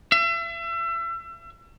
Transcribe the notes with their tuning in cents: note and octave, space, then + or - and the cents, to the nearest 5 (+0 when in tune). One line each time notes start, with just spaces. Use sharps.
E5 +35